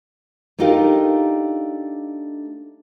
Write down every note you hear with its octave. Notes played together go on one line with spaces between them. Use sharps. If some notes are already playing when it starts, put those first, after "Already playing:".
A3 D4 D#4 F4 G4 A#4